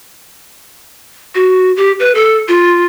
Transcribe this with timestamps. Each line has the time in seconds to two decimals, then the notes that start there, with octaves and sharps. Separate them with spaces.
1.35 F#4
1.77 G4
2.00 B4
2.15 A4
2.48 F4